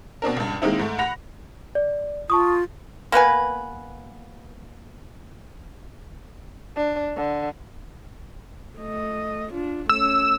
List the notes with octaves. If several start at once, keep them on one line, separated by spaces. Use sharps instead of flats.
B2 C4 D4 A#4
C#2 G2
D#3 G#3 A#3 C4 D#4 E4
G#2 A3
F#5 B5 A#6 F7
D5
F4 A5 C#6 D#6
A#3 B3 B4 G#5
D4
D3
A3 D#5
D4 F4
A3 C#4 E6